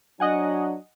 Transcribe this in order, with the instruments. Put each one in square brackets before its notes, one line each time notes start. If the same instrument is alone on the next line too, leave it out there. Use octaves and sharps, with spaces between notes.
[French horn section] F#3 D4 [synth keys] D#5 F#5 G#5